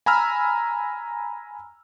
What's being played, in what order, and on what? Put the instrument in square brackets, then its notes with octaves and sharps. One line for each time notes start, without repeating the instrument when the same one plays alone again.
[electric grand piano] G#5 A#5 B5 E6 F6